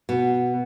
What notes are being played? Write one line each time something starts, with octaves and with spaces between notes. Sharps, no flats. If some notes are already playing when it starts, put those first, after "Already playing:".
B2